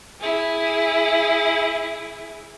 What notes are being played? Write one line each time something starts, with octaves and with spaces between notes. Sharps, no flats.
E4 G#4